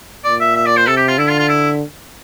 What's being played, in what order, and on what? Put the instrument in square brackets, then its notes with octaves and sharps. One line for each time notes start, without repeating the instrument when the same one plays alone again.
[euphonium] A#2 [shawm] D5
[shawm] E5
E5
D5
C5
[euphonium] C3 [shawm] A4
[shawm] G4
F4
[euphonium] D3 [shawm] E4
[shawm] F4
F4
E4